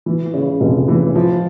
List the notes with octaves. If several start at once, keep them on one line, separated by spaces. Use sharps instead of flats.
E3
C#3
F1
E3
F3